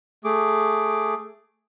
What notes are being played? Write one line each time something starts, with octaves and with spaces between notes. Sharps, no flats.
A3 G#4 D6